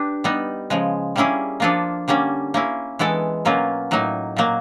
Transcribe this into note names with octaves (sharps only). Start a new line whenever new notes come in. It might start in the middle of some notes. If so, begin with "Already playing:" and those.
Already playing: D4 G4 B4
G3 B3 D#4
C#3 F3 G#3
G3 A#3 C#4 E4 G#4
F3 A#3 D4 F4 A4
D3 G3 A#3 C#4
A#3 C#4 E4
E3 G#3 B3 E4 A4
B2 F#3 A#3 C#4 F4
A2 F#3 A#3 D#4
A#2 F#3 A#3